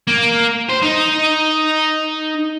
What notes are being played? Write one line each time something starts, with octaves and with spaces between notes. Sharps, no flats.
A#3
C5
D#4